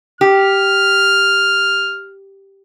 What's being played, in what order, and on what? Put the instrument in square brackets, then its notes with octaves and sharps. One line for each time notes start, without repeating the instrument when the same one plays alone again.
[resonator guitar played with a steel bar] G4 [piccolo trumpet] F6